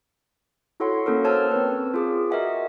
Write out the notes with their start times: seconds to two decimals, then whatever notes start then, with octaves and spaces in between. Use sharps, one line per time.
0.80 E4 F#4 A4 C#5 F#5 C6
1.06 A#3 C#4 A4 A#4
1.24 C5 C#5 A5 E6 F6
1.52 C4 A#4 B4
1.94 F4 G#4 D6
2.30 F#4 A#4 D#5 E5 F#5 G#5